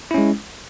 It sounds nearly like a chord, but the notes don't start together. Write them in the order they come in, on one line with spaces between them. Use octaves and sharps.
E4 C#4 G#3